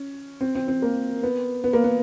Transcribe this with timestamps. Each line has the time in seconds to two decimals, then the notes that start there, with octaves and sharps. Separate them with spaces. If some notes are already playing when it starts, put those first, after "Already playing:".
Already playing: C#4
0.41 C4
0.55 C4
0.68 C4
0.82 A#3
1.23 B3
1.64 B3
1.73 A#3
1.84 B3